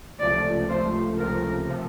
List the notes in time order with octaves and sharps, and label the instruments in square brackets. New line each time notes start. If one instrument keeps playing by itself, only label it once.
[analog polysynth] C#2 C3 F3 A3 [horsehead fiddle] D5
[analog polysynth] C#2 C3 F3 A3 [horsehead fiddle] C5
[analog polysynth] C#2 C3 F3 A3 [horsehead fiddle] A#4
[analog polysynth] C3 F3 A3